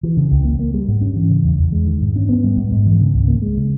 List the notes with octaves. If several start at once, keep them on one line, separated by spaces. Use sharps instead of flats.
E3
C#3
C#2
A#3
A#3
G3
G#2
C#4
E3
C#3
E2
E2
G#3
D#3
G#2
C#4
B3
G3
G#2
G#2
E3
C#3
C#2
A#3
G#3
C#3